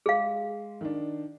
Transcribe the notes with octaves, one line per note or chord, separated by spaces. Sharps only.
G#3 G#4 F5
D#3 D4